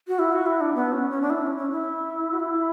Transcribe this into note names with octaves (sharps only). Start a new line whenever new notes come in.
F#4
E4
F#4
E4
D4
B3
C#4
C#4
D4
E4
C#4
C#4
E4
F#4
E4